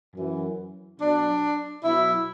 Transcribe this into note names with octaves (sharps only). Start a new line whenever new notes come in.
F#2 E3
B2 F#3 D4
B2 F#3 E4